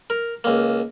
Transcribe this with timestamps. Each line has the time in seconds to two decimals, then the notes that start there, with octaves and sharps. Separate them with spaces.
0.10 A#4
0.44 C#2 A#3